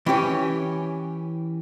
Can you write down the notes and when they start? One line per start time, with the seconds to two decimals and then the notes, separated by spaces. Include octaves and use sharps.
0.06 E3 C#4 G4 C#5